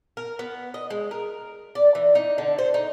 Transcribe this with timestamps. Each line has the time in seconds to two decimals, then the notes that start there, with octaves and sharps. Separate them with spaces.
0.17 A#4
0.39 B3
0.74 D#5
0.90 G#3
1.11 A#4
1.75 D5
1.95 E3
2.15 D#4
2.38 D3
2.59 C5
2.74 D#4